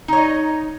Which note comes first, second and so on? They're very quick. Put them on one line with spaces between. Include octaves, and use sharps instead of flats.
D#4 C#5 D#5